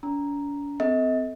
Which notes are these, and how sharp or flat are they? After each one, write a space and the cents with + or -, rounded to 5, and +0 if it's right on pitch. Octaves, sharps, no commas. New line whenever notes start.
D4 -45 A#5 +0
C4 -30 A4 +0 D#5 +40